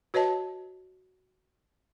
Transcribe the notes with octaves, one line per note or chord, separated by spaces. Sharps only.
F#4 B4 C#5 D#5 A5